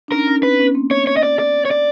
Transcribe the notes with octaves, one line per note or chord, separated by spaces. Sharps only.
D4
C#4 D#4 A#4
C#4 D#4
C4 D4 B4
B3 C#4
A#3 C4
C#5
C#5
D#5
D5
D5
C#5
D5